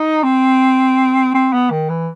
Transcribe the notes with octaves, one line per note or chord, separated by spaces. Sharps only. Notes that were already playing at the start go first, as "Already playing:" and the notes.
Already playing: D#4
C4
C4
B3
D#3
E3